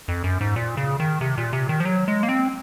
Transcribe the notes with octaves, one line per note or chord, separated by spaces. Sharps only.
F2
F#2
G#2
A#2
C#3
D#3
C3
A#2
C3
D#3
F3
F#3
G#3
A#3
C4